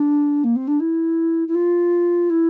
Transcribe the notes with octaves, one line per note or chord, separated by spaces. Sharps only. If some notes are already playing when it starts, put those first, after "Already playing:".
Already playing: D4
A#3
C4
D4
E4
E4
F4
E4